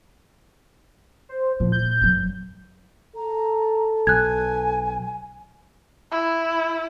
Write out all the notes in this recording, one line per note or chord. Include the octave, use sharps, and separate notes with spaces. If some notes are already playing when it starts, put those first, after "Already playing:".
C5
A#2 F3
G6
G2 F#3
A4 A#5
B1 G#5 F#6 G#6
E4